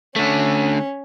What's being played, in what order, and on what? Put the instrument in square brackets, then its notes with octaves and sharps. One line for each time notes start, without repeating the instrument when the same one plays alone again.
[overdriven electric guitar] D3 A3 [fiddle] C#4